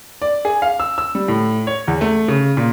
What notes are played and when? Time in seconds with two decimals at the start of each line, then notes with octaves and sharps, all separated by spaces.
0.22 D5
0.45 G#4
0.62 F5
0.80 E6
0.98 E6
1.15 G3
1.28 A2
1.67 C#5
1.88 E2
2.01 A3
2.28 C#3
2.57 A#2